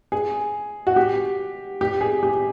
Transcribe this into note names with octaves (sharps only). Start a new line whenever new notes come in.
G#4
F#4
G4
G4
G#4
G4